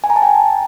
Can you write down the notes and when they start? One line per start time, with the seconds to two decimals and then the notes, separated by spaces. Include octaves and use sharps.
0.04 G#5
0.10 A#5
0.16 A5
0.22 G5